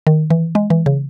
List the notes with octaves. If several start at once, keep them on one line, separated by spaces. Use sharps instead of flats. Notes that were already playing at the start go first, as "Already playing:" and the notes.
D#3
E3
G#3
E3
C#3